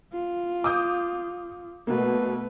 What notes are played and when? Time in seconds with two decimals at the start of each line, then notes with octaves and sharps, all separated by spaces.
0.13 F4
0.64 D6 D#6 G6
1.87 B2 A3 A#3 B4